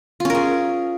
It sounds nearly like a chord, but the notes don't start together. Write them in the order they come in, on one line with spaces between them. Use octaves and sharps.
F4 C#4 A#4 G#4